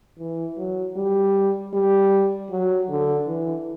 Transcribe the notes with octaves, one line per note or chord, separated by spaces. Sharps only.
E3
F#3
G3
G3
F#3
D3
E3